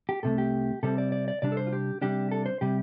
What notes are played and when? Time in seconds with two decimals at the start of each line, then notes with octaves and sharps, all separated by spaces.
0.09 G4
0.23 C2 C3 A3 A4
0.38 G4
0.83 C3 G3 C4 A4
0.98 D5
1.12 D5
1.28 D5
1.42 C3 G3 D4 D5
1.52 A4
1.57 C5
1.67 F4
1.73 G4
2.01 C3 G3 D4 G4
2.31 A4
2.46 C5
2.61 C3 G3 G4